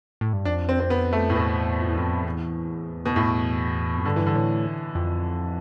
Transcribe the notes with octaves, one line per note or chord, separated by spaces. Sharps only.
A2
G2
F2 D4
C4
C4
B3
A3
A2
E2 B2
F2
E2
F2
E2
B2
A2
F2
G2 D3
E3
D3
A2
F2